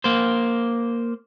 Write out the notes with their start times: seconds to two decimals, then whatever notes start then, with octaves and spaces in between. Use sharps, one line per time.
0.04 A#3 C5